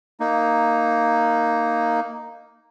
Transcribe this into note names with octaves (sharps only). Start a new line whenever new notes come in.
A#3 D#4